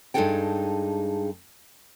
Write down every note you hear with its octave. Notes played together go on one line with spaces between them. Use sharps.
G2 G#3 D#4 G#4 A4 G5